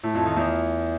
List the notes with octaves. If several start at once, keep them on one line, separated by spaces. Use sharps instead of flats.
A2
F2
D#3
E2